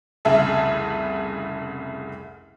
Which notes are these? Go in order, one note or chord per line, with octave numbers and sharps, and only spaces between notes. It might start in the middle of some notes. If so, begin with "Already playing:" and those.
F1 C2 C#3 G#4 E5 A5